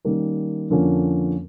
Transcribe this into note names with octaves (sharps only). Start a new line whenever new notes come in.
D#3 G3 A#3 C#4
F2 D3 F3 A#3 C#4